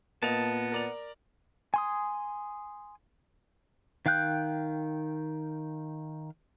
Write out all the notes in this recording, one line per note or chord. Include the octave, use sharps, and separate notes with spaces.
A#2 A#3 B3 D#5 A5 F7
A#4 D5 F7
G#5 C6 D#6
D#3 F5 G5 F#6 G6